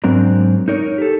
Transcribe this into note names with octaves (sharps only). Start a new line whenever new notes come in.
G#2 F#3 C4 D4 A#4
D#4 A#4 C#5
G4 A4